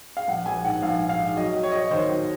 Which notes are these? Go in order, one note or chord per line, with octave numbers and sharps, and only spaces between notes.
F5
A#1 F#5
A#1 G#5
G#2 F#5
A#1 F5
G#2
F5
G#2
F#3 D#5
F#3
C#5
F#3 D#5
C#5
D#2 C5
F#3